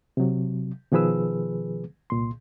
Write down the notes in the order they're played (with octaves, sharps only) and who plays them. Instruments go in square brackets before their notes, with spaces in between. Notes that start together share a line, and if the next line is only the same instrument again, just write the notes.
[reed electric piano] C3 F#3
B2 D#3 F3 G#4 B4 E6
C2 A#2 C6